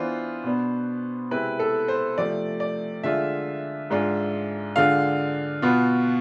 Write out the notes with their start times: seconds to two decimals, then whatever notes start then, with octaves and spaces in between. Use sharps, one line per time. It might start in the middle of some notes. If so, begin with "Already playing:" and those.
Already playing: E3 B3 D4 F4 C5
0.44 B2 B3 D4
1.31 C3 G#3 C4 E4 B4
1.59 A4
1.88 C5
2.17 C3 F3 A3 D5
2.60 D5
3.03 D3 G#3 D4 F4 E5
3.90 G#2 G#3 D4 F4
4.76 D3 G#3 D4 F4 F5
5.62 B2 B3 F4